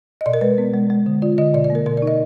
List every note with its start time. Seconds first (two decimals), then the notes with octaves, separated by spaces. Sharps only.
0.21 D#5
0.26 B2 D5
0.34 A#4
0.41 G#3 B4
0.58 B3
0.74 G#3
0.90 G#3
1.06 D3
1.22 F4 D5
1.38 D3 D#5
1.54 B2 D5
1.64 D5
1.70 A#3
1.75 A#4
1.86 B2 A#4
1.97 D#4 D5
2.07 D#5